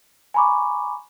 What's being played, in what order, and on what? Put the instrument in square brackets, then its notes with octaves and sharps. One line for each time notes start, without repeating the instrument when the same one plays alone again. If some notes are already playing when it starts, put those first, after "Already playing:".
[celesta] G#5 A#5 B5 C#6 D6